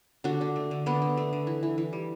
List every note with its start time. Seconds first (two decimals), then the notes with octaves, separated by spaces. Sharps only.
0.24 D3 D4 F#4
0.41 D3
0.56 A3
0.71 D3
0.86 D3 B3 D4
1.02 D3
1.17 A3
1.33 D3
1.47 E3
1.63 E3
1.78 E3
1.93 G3